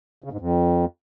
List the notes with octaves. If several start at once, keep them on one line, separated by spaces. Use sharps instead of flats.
C#3
G#2
F2